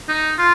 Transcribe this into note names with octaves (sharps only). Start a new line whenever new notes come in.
D#4
F4